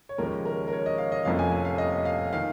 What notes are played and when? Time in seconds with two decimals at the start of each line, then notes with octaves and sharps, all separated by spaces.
0.09 C#5
0.18 D#2 C#3 F3 G#3 C#4 A#4
0.45 A#4
0.68 A#4
0.73 C#5
0.86 D#5
0.98 F5
1.12 D#5
1.25 F1 F2 F3 A#3 C#4 F5
1.39 G#5
1.52 G#5
1.65 F5
1.78 D#5
2.05 F5
2.33 D#3 F5